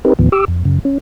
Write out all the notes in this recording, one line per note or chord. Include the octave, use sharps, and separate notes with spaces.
C4 D#4 G4 A#4 B4
D#2 A2 D#3 F3 B3
G4 D6 E6
F2
F#2 C#3
C#4